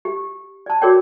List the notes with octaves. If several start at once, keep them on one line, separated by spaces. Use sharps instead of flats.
G4
D5 A5
F#4 G#4 A#4 C#5 D5 G5